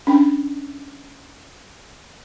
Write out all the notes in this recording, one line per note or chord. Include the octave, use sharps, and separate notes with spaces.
C#4 D4 G5